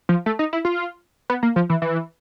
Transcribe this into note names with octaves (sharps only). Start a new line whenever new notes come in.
F3
A3
D#4
E4
F4
B3
A#3
F3
E3
E3